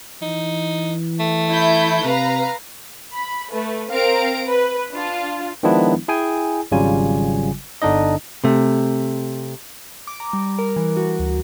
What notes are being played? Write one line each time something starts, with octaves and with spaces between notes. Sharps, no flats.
E3 D#4
A3
E4 G6
C3 B4 F5 A#5
B5
A3 B4
C4 A#4 F5 A#5 D7
B4
D4 F4
D#3 F3 G#3 B3 D4 E4
E4 G#4 G5 G#5
G#1 C#3 F#3 G3 F4 G#5
G1 D3 D4 D#4 D#5
C3 A3
D6
A#5
G3
A#4
E3
F#4
D2